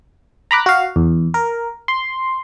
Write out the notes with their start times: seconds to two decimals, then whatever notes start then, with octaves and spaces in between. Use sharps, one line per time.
0.51 A#5 B5 D6 F#6
0.66 F#4 F5
0.96 E2
1.34 A#4
1.88 C6